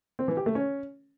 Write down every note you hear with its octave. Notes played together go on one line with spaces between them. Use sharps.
C4
E3
G4
A3
C#4